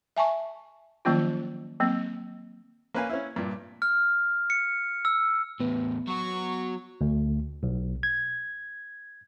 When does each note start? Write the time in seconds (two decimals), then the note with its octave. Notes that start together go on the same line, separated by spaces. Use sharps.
0.17 E5 G#5 A5 C#6
1.05 D#3 F3 F#3 A#3 C#4 F4
1.80 F#3 A#3 C4
2.94 A#3 C#4 B4 F5 G#5
3.10 C#4 E4
3.36 G2 A#2
3.82 F6
4.50 C#7
5.05 E6
5.60 E2 A2 B3
6.08 F#3 F#4 C#6
7.01 D2
7.63 B1
8.03 G#6